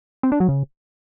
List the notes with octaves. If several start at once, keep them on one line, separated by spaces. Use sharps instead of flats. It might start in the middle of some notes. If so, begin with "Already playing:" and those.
C4
D4
F#3
C#3